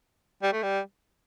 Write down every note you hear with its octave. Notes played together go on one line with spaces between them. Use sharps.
G3
A3
G3